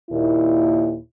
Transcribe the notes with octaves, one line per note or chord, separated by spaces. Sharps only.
D#2 A#2 E4